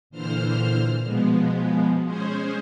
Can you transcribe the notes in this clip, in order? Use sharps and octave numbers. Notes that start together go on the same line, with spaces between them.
A#2 D3 E3 C5 F6
B2 F3 G#3 B3
G#3 C#4 G#4 C5